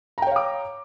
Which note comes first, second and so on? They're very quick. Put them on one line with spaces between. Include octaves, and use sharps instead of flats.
A#5 G5 C#5 F5 D6